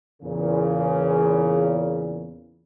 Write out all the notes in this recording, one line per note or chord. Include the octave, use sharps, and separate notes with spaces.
E2 A#2 C#3